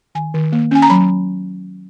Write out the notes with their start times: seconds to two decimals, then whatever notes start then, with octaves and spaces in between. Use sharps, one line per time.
0.15 D#3 G#5
0.34 D#3
0.52 A#3
0.71 C#4 G#5
0.82 A#5
0.90 F#3 B5